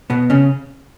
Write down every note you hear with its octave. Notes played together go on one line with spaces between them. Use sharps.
B2 B3
C#3 C#4